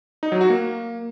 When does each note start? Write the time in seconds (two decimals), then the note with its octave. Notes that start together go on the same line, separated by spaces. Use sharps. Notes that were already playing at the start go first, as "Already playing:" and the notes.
0.23 D#4
0.32 F#3
0.41 F#4
0.50 A#3